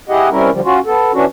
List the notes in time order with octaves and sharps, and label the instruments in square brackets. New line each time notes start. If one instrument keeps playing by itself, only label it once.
[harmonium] E4 G4 G#4 D#5 F#5
C3 G3 C#4 E4 A#4
D3 F3 G3
C#4 F4 F#4
B3 A4
E3 C#4 D4 F#4